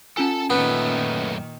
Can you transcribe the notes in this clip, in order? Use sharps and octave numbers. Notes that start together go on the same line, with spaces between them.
C#4 F4 A4 G#5 A5
F#2 A#2 D#3 A3 B3